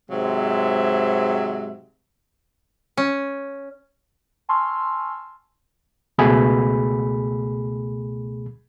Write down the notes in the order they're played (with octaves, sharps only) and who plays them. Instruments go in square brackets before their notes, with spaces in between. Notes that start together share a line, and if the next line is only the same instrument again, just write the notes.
[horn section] G#2 C3 F#3 G#3 E5
[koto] C#4
[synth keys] G#5 A5 C6 C#6 E6 F6
[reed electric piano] C#2 B2 A3 G#4 B5